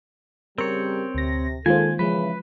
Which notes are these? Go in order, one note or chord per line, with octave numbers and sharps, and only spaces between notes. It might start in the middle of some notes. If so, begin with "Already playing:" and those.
C#3 G3 C4 A#4 C#5
D2 C3 A#6
D#3 G#3 A#3 F4 A4 C5 G#5
C#3 E3 F3 G#3 B4